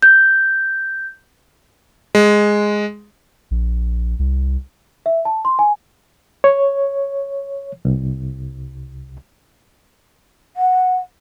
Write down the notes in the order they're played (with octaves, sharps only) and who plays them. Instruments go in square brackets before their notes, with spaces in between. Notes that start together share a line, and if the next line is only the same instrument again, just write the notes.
[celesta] G6
[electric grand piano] G#3
[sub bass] A#1
C2
[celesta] E5
A5
C6
G#5
[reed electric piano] C#5
C2
[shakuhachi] F#5